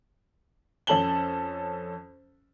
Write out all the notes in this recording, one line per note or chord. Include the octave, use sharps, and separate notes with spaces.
F2 C#4 A4 A5 F#7 G7